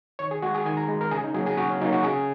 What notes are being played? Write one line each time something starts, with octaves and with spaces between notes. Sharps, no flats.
D#3 C#5
G#4
G#3 F#4
G#4
D#3 G#5
A#5
G#3
A#4
C#3 G#4
D#4
F#3 A#3 G#4
G#4
C#3 F#4
C#4
F#3 A#3 D#4
F#4
C#3 G#4